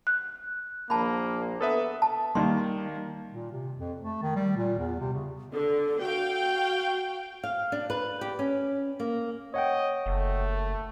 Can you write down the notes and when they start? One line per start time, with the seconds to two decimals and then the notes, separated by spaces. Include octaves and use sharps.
0.07 F#6
0.90 A#1 A#3 A5 B5
1.61 B3 A4 B4 E5 D#6
2.02 A5
2.35 D#3 G3 A#3 C6
3.32 A#2
3.52 C3
3.77 F2
4.01 A3
4.22 D#3
4.36 G3
4.57 A#2
4.78 E2
5.00 C3
5.13 C#3
5.53 D3 A4
6.01 F#4 F5 G5
7.44 F5
7.72 D4
7.90 B4
8.21 G4
8.39 C#4
9.00 A#3
9.54 C#5 D#5 F#5 G5
10.06 F#1 A3